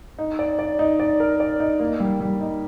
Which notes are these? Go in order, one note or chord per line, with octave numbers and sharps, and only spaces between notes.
D#4
D5
D5
D#4
D5
A#4
D5
D#4
A#3
G3
G3
D#4